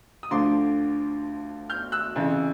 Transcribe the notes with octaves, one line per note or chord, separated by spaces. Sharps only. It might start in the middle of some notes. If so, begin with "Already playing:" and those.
D#6
D2 D3 F3 C6 D6
F6 G6
E6 F#6
F2 C#3 E3